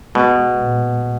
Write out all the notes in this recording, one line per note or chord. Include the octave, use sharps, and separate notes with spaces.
B2 G#3
A#2